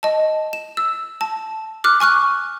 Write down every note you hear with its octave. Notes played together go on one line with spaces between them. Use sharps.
D#5 A5
E7
E6
A5
D6 F6 F#6
G#5 C#6 F6 F#6